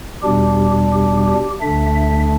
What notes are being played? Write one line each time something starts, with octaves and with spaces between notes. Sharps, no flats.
E2 B2 G3 D4 G4
G4
G4
D2 D3 A3 D4 E5
E5